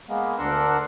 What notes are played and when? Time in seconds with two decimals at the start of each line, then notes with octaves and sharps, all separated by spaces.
0.09 G#3 A#3 B3
0.39 D2 D4 A#4 F#5 C6 E6